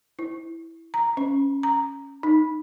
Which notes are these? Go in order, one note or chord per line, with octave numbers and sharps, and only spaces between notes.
E4
A#5
C#4
A#5
D#4